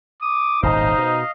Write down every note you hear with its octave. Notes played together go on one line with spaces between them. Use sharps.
D6 D#6
D#1 G#1 A2 D#4 C5 D#5 F5
B2